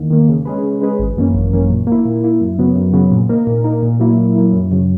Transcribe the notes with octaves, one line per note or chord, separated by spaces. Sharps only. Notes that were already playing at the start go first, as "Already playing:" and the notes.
Already playing: E2 D#3 A#3
D#3 A#3
C#3
G#3 C#4 G#4 B4
C#3
G#3 C#4 G#4 B4
G#1
F#2 E3 A#3 C#4
G#1
F#2 E3 A#3 C#4
A#2
A#3 E4
A#2
A#3 E4
F#2
C#3 F#3 B3
F#2
C#3 F#3 B3
A#2
A#3 D#4 A#4
A#2
A#3 D#4 A#4
A#2
F#3 A#3 E4
A#2
F#3 A#3 E4
F#2
C#3 F#3